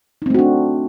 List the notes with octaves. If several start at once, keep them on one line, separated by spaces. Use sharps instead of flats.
A3 C4 D4 D#4 F#4